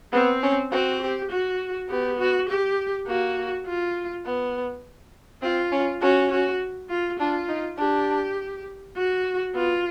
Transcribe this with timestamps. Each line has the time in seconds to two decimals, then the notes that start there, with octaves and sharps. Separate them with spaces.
0.13 B3 C4
0.43 C#4
0.71 C4 F#4
1.02 G4
1.31 F#4
1.89 B3 G4
2.19 F#4
2.49 G4
3.07 A#3 F#4
3.66 F4
4.25 B3
5.42 C4 F4
5.72 C#4
6.01 C#4 F#4
6.31 F#4
6.90 F4
7.19 D4 F4
7.48 D#4
7.78 D4 G4
8.96 F#4
9.54 B3 F4